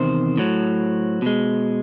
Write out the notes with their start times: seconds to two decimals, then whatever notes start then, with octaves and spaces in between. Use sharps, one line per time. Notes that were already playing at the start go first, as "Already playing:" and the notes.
Already playing: E2 C3 D#3 C5
0.37 A2 F#3
1.22 B2 G#3